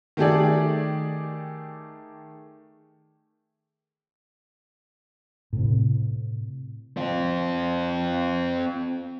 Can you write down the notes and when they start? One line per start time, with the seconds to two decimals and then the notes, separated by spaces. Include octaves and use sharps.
0.17 D#3 A3 G4 G#4 D5
5.53 A2 C3
6.97 C4 F4